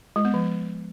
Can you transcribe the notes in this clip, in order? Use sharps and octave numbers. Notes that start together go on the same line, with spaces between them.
G#3
B3
F3